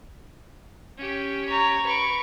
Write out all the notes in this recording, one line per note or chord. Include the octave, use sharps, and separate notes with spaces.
C#4 G4
C#5 A#5
B4 C#6 D7